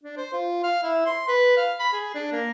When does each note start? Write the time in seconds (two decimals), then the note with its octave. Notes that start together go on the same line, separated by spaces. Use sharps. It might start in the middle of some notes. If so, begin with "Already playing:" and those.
0.04 D4
0.17 C5
0.33 F4
0.63 F5
0.83 E4
1.06 C6
1.28 B4
1.57 F5
1.79 B5
1.93 G#4
2.15 D4
2.33 A#3